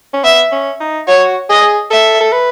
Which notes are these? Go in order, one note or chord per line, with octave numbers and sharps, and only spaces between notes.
C#4
B3 E5
C#4
D#4
F#4 C#5
G#4 D#5
A4 E5
A4
B4